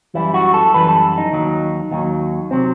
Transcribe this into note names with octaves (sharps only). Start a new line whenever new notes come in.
F#2 E3 G3 E4
F#4
A4
F#2 E3 G3 B4
A4
D#4
D#2 D#3 F#3
D#2 D#3 F#3
C3 F#3 C4